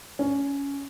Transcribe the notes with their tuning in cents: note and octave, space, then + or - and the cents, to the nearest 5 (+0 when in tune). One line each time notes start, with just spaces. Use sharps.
C#4 +15